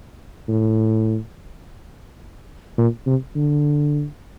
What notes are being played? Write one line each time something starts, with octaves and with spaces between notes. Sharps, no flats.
A2
A#2
C3
D3